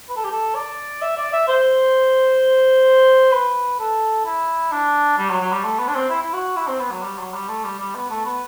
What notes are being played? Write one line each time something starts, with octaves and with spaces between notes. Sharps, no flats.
B4
A4
G4
A4
D5
E5
D5
E5
C5
B4
A4
E4
D4
G3
F#3
F#3
G3
A3
B3
D4
C4
E4
E4
F#4
E4
C4
B3
F#3
G3
F#3
G3
A3
G3
G3
B3
A3
B3